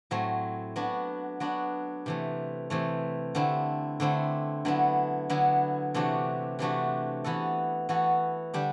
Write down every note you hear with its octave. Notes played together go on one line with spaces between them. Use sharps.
A2 F#3 A3 C4
F#3 B3 D4 F#4
F#3 B3 D4 F#4
C3 E3 A3
C3 E3 A3
D3 A3 C4 E4
D3 A3 C4 E4
D3 F#3 B3 E4
D3 F#3 B3 E4
C3 E3 A3 D4 F#4
C3 E3 A3 D4 F#4
E3 B3 F#4 A4
E3 B3 F#4 A4
D3 G3 D4 G4